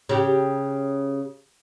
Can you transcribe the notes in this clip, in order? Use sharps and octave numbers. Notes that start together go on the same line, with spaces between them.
C#3 G4